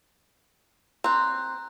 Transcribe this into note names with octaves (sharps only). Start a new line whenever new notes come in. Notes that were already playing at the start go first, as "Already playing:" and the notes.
C4 A#5 F#6